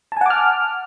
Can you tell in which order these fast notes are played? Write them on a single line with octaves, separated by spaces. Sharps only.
A5 G#5 F#5 D6 F6